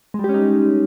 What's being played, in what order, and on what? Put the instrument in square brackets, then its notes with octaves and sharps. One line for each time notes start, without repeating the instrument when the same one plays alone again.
[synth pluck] G#3
G3
G4
C#4
D#4